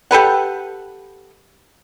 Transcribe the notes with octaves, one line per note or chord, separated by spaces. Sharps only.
G4 A4 B4 F#5